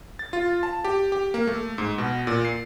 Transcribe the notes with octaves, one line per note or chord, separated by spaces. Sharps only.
A6
F4
A5
G4
G4
A#3
A3
G#2
B2
A#2
C7